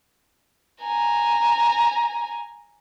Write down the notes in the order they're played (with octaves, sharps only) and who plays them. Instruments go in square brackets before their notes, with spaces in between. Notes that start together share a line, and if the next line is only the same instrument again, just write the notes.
[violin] G#5 A#5